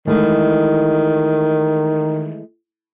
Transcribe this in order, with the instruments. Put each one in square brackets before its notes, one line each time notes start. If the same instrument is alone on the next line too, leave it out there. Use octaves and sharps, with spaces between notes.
[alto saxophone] D#3 [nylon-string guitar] E3 G#3 A3